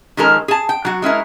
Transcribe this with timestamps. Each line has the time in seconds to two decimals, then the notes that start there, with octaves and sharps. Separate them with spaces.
0.17 D#3 F3 G#3 C#4 A4 A#4
0.48 G#4 A5
0.69 G5
0.85 F#3 F#4
1.02 G#3 C#4 E4 A#4